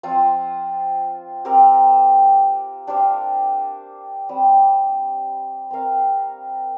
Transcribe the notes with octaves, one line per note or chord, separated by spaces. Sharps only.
F3 C4 F4 C5
C4 G4 A#4
D4 G4 C5 F5
G3 C4 G4
C4 A#4 F5